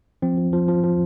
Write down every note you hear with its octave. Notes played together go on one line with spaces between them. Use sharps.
F3 C4
F3
F3
F3
F3